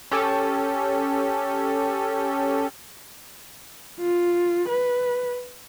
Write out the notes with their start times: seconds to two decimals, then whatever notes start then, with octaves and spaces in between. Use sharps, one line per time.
0.11 C#4 G4 A4
4.00 F4
4.68 B4